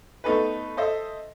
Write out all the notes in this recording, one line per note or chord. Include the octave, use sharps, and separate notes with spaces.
A3 B3 D#4 A4 B4
A4 C5 D#5 E5